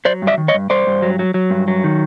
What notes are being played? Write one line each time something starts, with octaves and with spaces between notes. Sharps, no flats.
F#3 C5 D5
G2
D5 E5
D#3
C#5 D#5
G2
G2 C5 D5
G2
F#3
F#3
F#3
G2
F#3
D#3